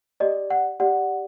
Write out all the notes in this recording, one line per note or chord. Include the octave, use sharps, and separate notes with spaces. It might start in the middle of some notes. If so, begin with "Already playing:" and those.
G4 D5 D#5
F#5
G4 D5 F#5